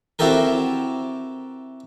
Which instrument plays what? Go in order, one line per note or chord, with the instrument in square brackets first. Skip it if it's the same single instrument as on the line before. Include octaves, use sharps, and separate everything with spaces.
[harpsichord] C4 E4 F#4 G4 A4 A#4